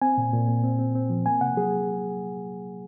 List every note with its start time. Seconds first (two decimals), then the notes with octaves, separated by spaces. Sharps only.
0.02 C4 G#5
0.18 A#2
0.33 A#2
0.48 A#2
0.63 C4
0.79 C4
0.95 C4
1.10 F3
1.26 A#3 G#5
1.41 C3 F#5
1.57 F#3 G#4